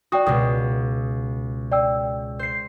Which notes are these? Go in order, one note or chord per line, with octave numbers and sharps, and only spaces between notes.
F#4 D5 G5 D#6
C#2 B2 D#6
D5 G5 E6
C5 C7